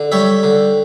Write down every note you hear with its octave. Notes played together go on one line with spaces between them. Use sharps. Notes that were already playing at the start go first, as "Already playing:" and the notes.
Already playing: D3
G3 C#5 E5
D3